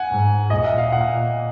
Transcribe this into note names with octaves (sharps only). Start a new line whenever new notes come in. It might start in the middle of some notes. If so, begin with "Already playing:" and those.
Already playing: F#5 G#5
G#2
A#2 D#5
E5
F5
A#2 F#5